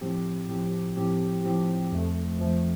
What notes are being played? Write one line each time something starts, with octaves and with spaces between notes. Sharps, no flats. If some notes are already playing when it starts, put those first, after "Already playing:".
A2 F3 C4 G4
A2 F3 C4 G4
A2 F3 C4 G4
A2 F3 C4 G4
F2 F3 A3
F2 F3 A3